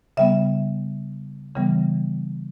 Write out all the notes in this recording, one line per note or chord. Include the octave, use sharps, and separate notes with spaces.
C#3 G3 B3 E5
C#3 E3 G3 B3